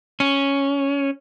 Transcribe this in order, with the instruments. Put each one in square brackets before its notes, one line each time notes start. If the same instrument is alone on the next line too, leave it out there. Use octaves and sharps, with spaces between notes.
[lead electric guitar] C#4